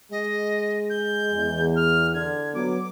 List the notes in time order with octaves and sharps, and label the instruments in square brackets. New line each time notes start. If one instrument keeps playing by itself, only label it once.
[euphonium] G#3 [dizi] D#5
[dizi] G6
[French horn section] E2
[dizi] F6
[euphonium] D3 [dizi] G#6
[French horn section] F#3 B3 [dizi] D6